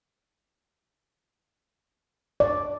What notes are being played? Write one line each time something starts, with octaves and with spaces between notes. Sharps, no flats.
D5